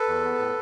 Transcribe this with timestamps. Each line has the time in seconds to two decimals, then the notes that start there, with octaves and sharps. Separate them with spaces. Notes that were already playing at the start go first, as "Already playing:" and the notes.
Already playing: A4 B4
0.08 E2
0.24 B3
0.39 A2